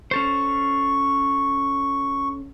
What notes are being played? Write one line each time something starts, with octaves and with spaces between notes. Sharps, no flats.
C#4 A4 C5 C#6